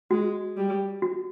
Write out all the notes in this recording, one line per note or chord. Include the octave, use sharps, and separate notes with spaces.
G#3 F#4
G3
F#4